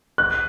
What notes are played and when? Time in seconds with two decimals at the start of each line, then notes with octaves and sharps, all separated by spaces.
0.18 F#6